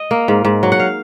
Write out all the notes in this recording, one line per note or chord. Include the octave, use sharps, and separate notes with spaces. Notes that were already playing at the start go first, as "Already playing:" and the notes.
Already playing: D#5
A#3
G#2
G#2
F#3
F#5
F5